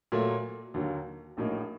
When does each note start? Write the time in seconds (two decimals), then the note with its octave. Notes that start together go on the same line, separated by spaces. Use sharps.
0.12 A#2 F#3 A3
0.74 D#2 D3 F#3 A#3
1.37 A#1 A2 F#3 A#3 D#4